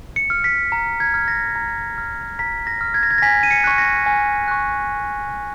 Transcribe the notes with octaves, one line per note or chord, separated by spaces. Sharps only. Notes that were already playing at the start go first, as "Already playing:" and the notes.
C#7
F6
B6
A#5
G#6
F6
A#6
A#5
F6
A#5 B6
A#6
F6
G#6
A#6
G#6
A#6
G#5 B6
D#7
C#7
C#6 F#6
A#6
G#5
C#6 F#6